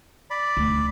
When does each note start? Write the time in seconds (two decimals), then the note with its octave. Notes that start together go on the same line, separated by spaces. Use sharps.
0.30 D5 B5
0.57 D2